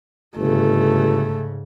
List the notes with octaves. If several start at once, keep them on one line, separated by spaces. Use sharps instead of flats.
G1 G#2 C#3 A3